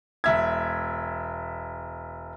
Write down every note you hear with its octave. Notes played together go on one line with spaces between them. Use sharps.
E1 E5 G#6